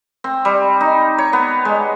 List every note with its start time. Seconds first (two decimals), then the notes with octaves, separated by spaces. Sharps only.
0.24 C4
0.45 G3
0.81 D#4
1.18 C#5
1.33 B3
1.65 G#3